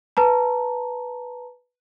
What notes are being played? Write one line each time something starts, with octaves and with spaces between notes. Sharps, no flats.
B4 A5 A#5